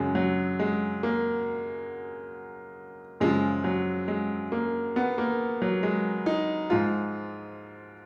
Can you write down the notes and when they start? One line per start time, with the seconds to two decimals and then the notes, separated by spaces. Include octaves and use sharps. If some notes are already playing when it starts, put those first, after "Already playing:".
Already playing: F#2 C#3 F#3 G#3
0.15 F#3
0.59 G#3
1.03 A#3
3.20 F#2 C#3 F3 G#3
3.64 F#3
4.08 G#3
4.52 A#3
4.96 B3
5.18 A#3
5.62 F#3
5.83 G#3
6.26 D#4
6.70 G#2 F3 F4